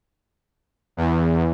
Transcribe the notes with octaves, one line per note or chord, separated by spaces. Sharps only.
E2